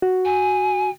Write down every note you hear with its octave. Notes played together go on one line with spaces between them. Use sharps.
F#4
G#5